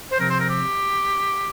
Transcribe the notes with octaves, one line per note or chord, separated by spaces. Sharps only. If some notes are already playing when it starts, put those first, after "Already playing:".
C5
C3 F3 C4 A#4
C5
A#4
G4